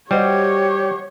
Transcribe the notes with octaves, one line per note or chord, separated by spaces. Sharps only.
G3 F#4 G4 C5 C#5 D#5